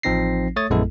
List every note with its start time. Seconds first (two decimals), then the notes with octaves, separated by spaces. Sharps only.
0.03 A1 F3 C4 D#4 A#6 C7
0.56 A3 C#5 D#6 A6
0.70 A#1 F#2 G#3 B3 E4 A4